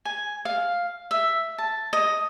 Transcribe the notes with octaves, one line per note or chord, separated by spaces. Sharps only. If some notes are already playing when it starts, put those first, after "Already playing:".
G#5
F5
E5
A5
D#5